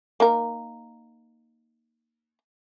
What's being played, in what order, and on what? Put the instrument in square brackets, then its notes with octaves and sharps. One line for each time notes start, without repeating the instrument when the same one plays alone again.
[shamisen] A#3 D#4 A#4